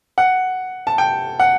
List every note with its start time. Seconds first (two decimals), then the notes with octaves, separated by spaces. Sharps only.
0.18 F#5
0.87 A5
0.98 G5
1.40 F#5